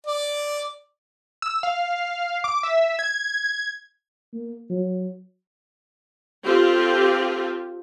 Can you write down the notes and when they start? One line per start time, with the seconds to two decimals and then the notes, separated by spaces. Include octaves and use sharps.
0.07 D5
1.42 E6
1.63 F5
2.44 D6
2.63 E5
2.99 G#6
4.34 A#3
4.70 F#3
6.44 C4 F4 G4 A4